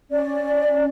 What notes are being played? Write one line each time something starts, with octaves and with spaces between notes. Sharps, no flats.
C#4 D5